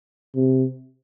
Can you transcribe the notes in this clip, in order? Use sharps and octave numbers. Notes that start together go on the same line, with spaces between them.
C3